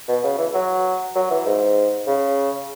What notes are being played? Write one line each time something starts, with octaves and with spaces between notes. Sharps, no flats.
B2
C#3
E3
F#3
F#3
E3
G#2
C#3